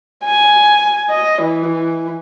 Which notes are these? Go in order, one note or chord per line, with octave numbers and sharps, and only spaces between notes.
G#5
D#5
E3